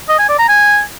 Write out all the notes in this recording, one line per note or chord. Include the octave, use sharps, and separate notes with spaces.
D#5
G#5
D5
A#5
G#5